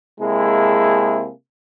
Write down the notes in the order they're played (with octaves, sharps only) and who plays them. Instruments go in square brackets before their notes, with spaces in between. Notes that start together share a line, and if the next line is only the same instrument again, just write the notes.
[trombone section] C3 G#3 A#3 E4 G#4 A4